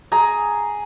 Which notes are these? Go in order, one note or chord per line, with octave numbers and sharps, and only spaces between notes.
G#4 A#5